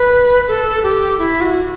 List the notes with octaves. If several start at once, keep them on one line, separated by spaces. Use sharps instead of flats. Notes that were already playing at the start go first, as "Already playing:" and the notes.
Already playing: B4
A4
G4
E4
F#4